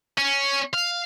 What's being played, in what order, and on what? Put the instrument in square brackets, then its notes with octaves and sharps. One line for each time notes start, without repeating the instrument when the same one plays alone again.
[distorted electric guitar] C#4
F5